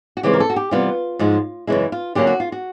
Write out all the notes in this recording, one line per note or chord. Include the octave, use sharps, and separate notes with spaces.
F#4
C#3 E3 G#3 C4 G4
A#4
A4
F#4
G4
C3 E3 G3 B3 F4
G#2 F3 G#3
F#2 C#3 E3 G#3 E4
F4
D3 F#3 A#3 C#4 G4
F#4
F4
F#4